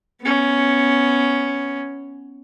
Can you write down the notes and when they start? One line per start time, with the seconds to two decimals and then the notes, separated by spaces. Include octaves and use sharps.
0.21 B3 C#4